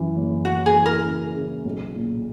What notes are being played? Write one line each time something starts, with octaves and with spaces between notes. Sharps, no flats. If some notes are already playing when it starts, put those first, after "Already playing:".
Already playing: F#2 E3
F#1
F#1 F#4
G#4
E3
A#4
C#3
C#3
B1
A#2